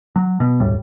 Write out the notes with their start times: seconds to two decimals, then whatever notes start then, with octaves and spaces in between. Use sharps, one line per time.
0.16 F#3
0.40 B2
0.60 F#1 D#2 A2 G3